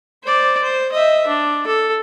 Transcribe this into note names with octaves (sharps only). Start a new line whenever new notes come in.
C5 D5
C5
D#5 E5
D4
A4